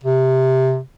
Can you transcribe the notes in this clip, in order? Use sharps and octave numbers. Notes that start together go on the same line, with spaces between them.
C3